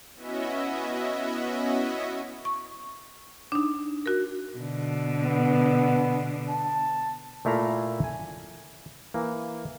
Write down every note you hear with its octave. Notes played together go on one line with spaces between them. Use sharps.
B3 C#4 E4 F#4 D#5 E5
C#6
D4 D#4
F#4 A#4
B2 D3
B3
A5
A#2 A3 E4 F5 A#5
G#5
E3 A#3